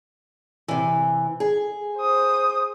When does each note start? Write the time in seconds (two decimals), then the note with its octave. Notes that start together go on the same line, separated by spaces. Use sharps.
0.68 C3 E3
1.40 G#4
1.97 C5 D#6